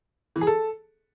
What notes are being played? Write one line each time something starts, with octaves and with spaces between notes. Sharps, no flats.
E3
G#4
A4